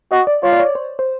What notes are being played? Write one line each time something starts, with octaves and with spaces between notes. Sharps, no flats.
F#4 D#5
D5
F4 C#5
D5
C#5
C5
C5